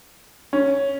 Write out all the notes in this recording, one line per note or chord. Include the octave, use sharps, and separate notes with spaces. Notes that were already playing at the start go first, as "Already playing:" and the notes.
C#4